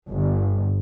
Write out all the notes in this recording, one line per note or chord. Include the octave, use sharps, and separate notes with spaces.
G1